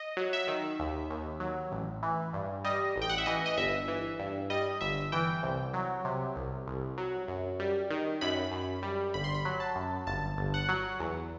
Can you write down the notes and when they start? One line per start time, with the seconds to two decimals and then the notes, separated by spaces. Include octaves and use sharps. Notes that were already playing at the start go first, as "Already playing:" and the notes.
Already playing: D#5
0.17 F#3
0.33 E5
0.48 D#3
0.79 D#2
1.10 D#2
1.40 F#3
1.72 A1
2.03 E3
2.33 G2
2.64 G3 D#5
2.96 A1
3.02 G5
3.09 F#5
3.18 E5
3.26 E3 D#5
3.46 D#5
3.57 G1 E5
3.88 E3
4.19 G2
4.50 G3 D#5
4.81 G1 E5
5.12 E3 G5
5.43 C2
5.74 F#3
6.05 C3
6.36 C2
6.66 C2
6.98 F#3
7.28 F#2
7.60 G3
7.90 D#3
8.21 F#2 B5
8.52 F#2
8.83 G3
9.14 G1 B5
9.24 C6
9.34 B5
9.45 F#3
9.60 A5
9.76 F#2
10.07 G1 A5
10.37 G1
10.54 F#5
10.69 F#3
11.00 E2